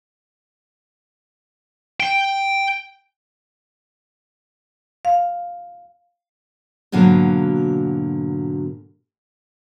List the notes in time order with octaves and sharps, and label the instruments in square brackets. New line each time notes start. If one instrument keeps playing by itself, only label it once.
[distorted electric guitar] G5
[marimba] F5
[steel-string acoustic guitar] G#2 B2 D3 F#3 A#3